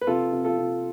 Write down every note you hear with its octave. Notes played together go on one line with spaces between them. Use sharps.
B4
C3 F4 A4
C3
F4 A4
C3